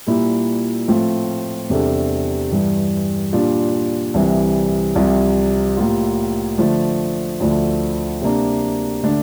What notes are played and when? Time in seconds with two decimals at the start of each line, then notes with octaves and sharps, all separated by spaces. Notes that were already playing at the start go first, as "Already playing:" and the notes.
0.07 A#2 G3 A#3 E4
0.88 A2 F3 A3 C4 F4
1.70 E2 C3 G3 D4 A4
2.51 G2 E3 G3
3.33 A#2 G3 D4 F4
4.14 C2 C3 E3
4.95 C2 C3 F3
5.77 A2 G3 A#3 F4
6.58 D3 F3 A3
7.40 D2 D3 F3 A3
8.21 C3 G3 A#3 D4
9.04 D3 A3 D4